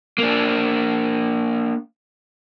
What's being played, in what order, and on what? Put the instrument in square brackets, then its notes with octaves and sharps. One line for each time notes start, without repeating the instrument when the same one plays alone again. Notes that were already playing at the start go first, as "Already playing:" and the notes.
[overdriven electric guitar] A#3 D4